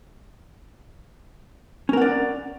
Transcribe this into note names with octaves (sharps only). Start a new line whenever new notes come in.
C#4 A#4 D5 F#5